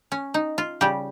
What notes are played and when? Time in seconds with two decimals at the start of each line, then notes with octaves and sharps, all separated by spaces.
0.12 C#4
0.34 D#4
0.58 F4
0.81 C#3 G3 G4